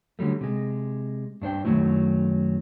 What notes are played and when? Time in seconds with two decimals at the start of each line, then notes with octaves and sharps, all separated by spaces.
0.19 D3 F#3 G3 A3
0.41 C3 G#3
1.42 G2 D4 C5 G5
1.65 F#2 D#3 F3 F#3 A3 E4